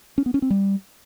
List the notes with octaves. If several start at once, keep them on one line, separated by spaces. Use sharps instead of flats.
C#4
B3
C#4
C4
G3